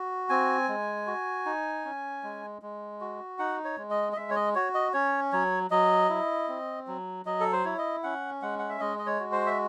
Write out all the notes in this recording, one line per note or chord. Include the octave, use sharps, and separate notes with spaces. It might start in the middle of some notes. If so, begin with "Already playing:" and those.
Already playing: F#4
C4 G#5
G#3
F#4
D#4
C#4
G#3
G#3
F#4
D#4 F#5
C#5
G#3
D#5
D#5
G#3 E5
C#5
D#5
F#4 C#5
D#5
C#4 C#5
F#3 C#5
F#3 D#5
E4
C4
F#3
F#3 D#5
A4
C5
E4 C#5
D#5
C#4 F#5
G#3 F#5
F#5
E5
G#3 D#5
D#5
C#5
F#4
C5
E5